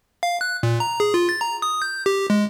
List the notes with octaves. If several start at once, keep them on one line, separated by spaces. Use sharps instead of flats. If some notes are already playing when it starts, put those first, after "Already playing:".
F5
F#6
A#2
A#5
G#4
F4
A6
A#5
D#6
G6
G4
G#3